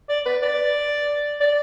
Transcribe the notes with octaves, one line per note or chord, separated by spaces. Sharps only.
D5
B4
D5
D5